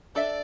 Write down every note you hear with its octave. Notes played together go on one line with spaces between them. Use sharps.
D4 A4 D5 E5